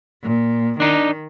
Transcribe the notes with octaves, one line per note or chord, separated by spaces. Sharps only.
A#2
D#3 D4 D#4